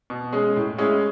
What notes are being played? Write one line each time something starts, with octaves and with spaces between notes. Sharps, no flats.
B2
G#3 C#4 G#4
A2
G#3 C#4 E4 G#4